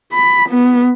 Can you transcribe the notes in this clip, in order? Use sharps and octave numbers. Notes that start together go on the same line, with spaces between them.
B5
B3